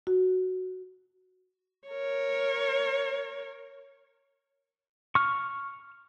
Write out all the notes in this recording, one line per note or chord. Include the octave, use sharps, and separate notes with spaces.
F#4
A#4 C#5
C#6 F6